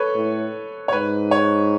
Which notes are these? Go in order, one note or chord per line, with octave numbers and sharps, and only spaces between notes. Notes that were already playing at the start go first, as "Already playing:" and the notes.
Already playing: A4 B4 C#5
A2
C#5
G#2 B4
C#5